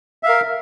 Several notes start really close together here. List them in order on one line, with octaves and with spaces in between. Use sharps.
E5 F5 A#4